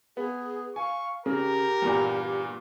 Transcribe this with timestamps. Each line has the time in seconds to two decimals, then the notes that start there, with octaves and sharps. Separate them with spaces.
0.17 B3 G#4
0.76 F5 G#5 C#6
1.26 C#3 G4 A#4
1.82 E2 G2 A#2